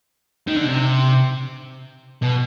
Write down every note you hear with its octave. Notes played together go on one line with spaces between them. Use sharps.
D#3
D3
C3
B2